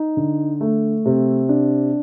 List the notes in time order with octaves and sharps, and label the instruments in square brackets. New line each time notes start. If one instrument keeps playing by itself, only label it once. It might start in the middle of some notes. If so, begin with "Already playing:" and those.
Already playing: [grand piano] D#4
D3
A3
C3
D4